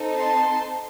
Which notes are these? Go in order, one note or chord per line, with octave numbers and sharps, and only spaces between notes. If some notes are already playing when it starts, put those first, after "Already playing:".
Already playing: C4 D#4 A4
A5 C6